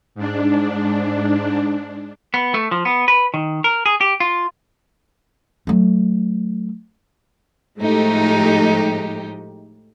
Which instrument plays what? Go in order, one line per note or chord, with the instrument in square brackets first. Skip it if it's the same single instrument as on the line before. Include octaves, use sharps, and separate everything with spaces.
[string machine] G#2 D4
[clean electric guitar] B3
A3
F3
B3
B4
D#3
A#4
G#4
G4
F4
[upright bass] F#3 A3
[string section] A2 F3 G#3 A3 D#4 G4